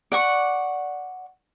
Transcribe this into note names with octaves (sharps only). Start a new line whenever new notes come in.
D5 F#5 C#6